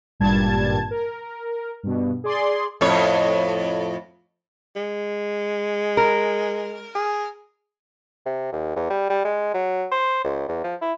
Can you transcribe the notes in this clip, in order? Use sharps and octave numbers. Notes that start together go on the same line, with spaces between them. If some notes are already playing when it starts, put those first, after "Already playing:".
G#1 G2 A#2 G3 A5 G#6
A#4
G2 B2
G#4 D5 C6
F2 A2 C#5
G#3
A#4
G#4
C3
D#2
E2
G3
G3
G#3
F#3
C5
C#2
E2
F3
E4